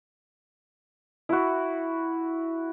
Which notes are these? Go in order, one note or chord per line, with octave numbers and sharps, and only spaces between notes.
E4 F#4